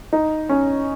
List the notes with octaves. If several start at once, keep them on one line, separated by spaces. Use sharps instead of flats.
D#4
C#4